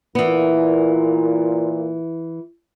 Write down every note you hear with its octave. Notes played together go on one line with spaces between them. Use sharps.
A#2 E3 B3